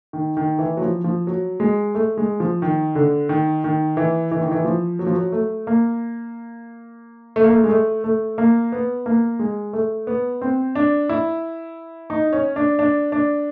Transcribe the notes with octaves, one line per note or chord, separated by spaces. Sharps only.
D#3
D#3
E3
F#3
F3
F3
F#3
G#3
A3
G#3
F3
D#3
D3
D#3
D#3
E3
E3
D#3
E3
F3
F#3
F3
F#3
A3
A#3
A3
A#3
A3
G#3
A3
A3
A#3
B3
A#3
G#3
A3
B3
C4
D4
E4
D#4
C#4
D4
D4
D4